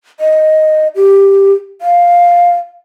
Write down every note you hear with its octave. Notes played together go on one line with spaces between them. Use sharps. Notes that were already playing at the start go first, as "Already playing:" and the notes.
D#5
G4
F5